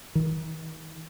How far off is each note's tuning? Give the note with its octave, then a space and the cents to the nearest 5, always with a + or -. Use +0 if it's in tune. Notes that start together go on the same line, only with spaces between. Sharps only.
D#3 +40